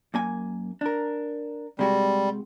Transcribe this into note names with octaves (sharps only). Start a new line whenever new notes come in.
F#2 A#3 G#5
D4 A#4
C3 G3 G#3 F#4